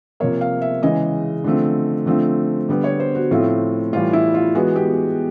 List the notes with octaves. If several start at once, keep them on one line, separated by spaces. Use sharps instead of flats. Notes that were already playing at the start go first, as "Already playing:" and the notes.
C3 F3 A#3 C#5
F5
E5
C#3 E3 G#3 D#5
D3 F3 A3 C4
D3 F3 A3 C4
D3 G3 B3
C#5
C5
F#4
A2 F3 A3 C4 F4
A2 E3 G3 F4
E4
F4
E3 G#3 B3 F#4
G4